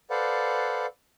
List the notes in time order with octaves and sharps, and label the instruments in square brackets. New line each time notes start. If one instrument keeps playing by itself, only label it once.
[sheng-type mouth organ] A4 B4 C5 D5 F5 F#5